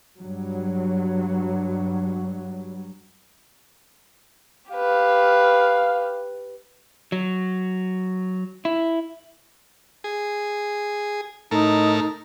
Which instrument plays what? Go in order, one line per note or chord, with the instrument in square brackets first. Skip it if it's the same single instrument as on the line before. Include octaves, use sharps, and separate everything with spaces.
[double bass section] G2 F#3
[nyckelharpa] G4 B4 [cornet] F5
[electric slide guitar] F#3
E4
[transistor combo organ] G#4
[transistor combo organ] A2 A4 A#4 [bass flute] D#4